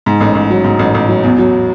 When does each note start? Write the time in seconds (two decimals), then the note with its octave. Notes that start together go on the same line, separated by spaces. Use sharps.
0.06 G#2
0.21 A1
0.35 A1
0.50 F#3
0.64 G#2
0.79 A1
0.95 A1
1.09 F#3
1.24 E2
1.38 F#3